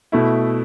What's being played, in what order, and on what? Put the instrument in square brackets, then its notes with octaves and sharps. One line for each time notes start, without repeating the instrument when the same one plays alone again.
[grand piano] B2 A3 E4